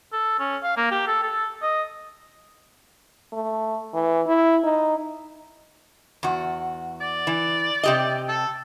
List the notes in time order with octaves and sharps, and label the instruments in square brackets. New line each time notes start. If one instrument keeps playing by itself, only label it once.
[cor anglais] A4
C#4
F5
A#3
G4
A4
A4
D#5
[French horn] A3
E3
E4
D#4
[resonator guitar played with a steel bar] E2 F#4
[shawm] D5
[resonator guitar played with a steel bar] E3
C3 G4 D#5
[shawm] A4